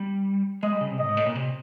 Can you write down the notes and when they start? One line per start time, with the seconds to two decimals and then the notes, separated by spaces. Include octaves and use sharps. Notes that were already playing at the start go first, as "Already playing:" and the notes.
Already playing: G3
0.63 G#3 D#5
0.72 G3
0.81 C#3
0.90 C3
0.99 A2 D#5
1.08 G#2
1.17 A2
1.26 A#2
1.35 C3